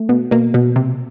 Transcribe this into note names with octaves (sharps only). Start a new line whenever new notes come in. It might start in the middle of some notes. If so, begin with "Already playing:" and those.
Already playing: A3
B2
B2 A#3
B2
C3